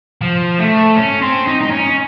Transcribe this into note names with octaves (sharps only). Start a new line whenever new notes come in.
F3
A3
C#4
C4
D#4
D#4
C#4